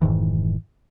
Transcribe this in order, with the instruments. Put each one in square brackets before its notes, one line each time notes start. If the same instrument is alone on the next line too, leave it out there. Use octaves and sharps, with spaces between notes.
[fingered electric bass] F1 G#2 D#3 E3